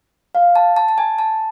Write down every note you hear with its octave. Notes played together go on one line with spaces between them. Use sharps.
F5
A5
A5
A5
G#5
A5